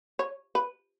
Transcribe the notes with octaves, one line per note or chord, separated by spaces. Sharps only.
C#5
B4